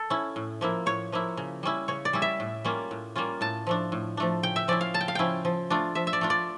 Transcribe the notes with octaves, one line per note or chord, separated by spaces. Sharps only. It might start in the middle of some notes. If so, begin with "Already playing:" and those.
Already playing: A4
C#4 E4
A2
F3 A#3 E4
A2 C#5
F3 A#3 E4
C#3
G3 C#4 E4
C#3 C#5
D5
G3 C#4 E4
E5
A2
G3 A#3 C#4 F4
A2
G3 A#3 C#4 F4
A2 A5
F3 A3 D4
A2
F3 A3 D4
C#3 G5
E5
F3 C#4 E4 D5
F5
C#3 A5
G5
F5
F3 C#4 E4 G5
F3
A3 D4 F4
F3 E5
E5
D5
A3 D4 F4
D5